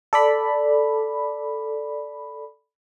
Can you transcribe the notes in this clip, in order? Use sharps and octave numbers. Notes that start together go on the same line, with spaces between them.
A4 D5 B5